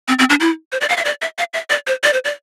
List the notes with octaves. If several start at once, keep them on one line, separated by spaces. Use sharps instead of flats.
C4
C4
D4
E4
C5
D5
F5
E5
D5
E5
F5
E5
D5
C5
D5
C5
D5